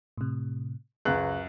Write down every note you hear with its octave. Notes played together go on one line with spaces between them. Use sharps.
A2 C3
C#2 F#2 G#4 B4 F#6